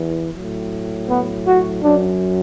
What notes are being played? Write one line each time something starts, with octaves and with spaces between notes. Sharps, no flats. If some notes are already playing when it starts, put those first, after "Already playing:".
Already playing: E2 E3
F#3
A2
B3
F#4
F#2 F#3 D4